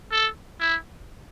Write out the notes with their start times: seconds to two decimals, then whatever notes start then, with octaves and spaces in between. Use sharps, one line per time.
0.12 A4
0.60 E4